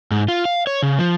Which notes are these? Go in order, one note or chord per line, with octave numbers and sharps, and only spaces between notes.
G#2
F4
F5
C#5
C#3
F3